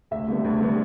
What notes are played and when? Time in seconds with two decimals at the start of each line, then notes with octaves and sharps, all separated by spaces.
0.11 D2 E5
0.28 D3 G3 B3
0.44 D2
0.61 D3 G3 B3